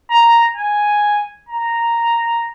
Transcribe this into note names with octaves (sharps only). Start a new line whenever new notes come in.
A#5
G#5
A#5